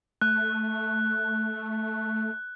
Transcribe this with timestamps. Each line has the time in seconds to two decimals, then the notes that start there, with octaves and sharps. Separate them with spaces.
0.21 A3 F#6